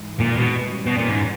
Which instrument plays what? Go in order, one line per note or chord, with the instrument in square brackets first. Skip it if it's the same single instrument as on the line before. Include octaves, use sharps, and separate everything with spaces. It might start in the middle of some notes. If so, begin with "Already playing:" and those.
Already playing: [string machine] G#2 E3 G#3
[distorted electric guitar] A#2
B2
[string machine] E3 G3 C#4
[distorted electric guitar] B2
A#2
G#2